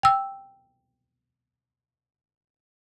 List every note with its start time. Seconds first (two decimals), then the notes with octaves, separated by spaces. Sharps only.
0.03 G5 E6